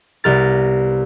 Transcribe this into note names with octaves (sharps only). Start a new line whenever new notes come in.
C2 B3 A#4 A6